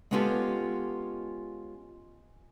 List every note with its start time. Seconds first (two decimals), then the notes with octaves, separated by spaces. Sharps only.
0.11 G#3 B3 C#4 F4 G4 A4